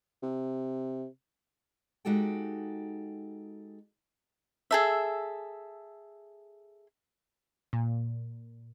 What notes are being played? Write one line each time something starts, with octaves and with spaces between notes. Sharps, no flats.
C3
G#3 D#4 F#4 G4 A4 G5
G#4 A4 E5
A#2